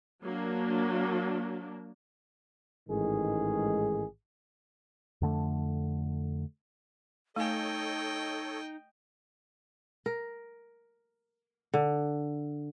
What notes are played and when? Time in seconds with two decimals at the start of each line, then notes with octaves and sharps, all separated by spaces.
0.24 F#3 A#3 D4
2.89 A1 G#2 D#3 G#3 G#4
5.21 F2 D3 A3
7.36 A3 D#4 A4 C#5 D#5 G5 G#5
10.06 A#4
11.74 D3